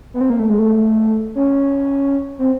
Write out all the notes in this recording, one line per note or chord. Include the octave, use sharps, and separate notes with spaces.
B3
C4
A#3
A3
G#3
A3
C#4
C4